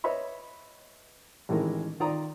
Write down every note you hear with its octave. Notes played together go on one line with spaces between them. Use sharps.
B4 C#5 D#5 E5 B5
A1 D#3 E3 G#3 A#4
D#3 F4 D5 A#5 D#6